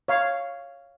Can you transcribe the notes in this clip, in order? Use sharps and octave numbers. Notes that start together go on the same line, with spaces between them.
C#5 F5